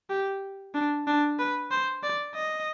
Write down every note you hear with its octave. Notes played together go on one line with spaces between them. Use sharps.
G4
D4
D4
B4
C5
D5
D#5